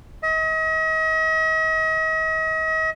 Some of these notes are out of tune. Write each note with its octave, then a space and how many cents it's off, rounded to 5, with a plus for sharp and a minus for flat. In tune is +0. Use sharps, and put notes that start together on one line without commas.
D#5 +40